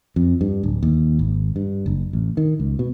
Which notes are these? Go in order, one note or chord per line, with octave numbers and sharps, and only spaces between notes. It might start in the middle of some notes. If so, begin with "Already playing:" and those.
F2
G2
D1
D#2
G#1
G2
F#1
A1
D#3
C#2
B2